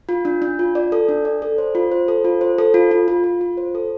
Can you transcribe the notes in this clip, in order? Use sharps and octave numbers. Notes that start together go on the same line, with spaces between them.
F4
D4
D4
F4
D5
A4
D4
D5
A4
C5
F4
C5
A4
F4
C5
A4
F4
F4
F4
F4
F4
C5
A4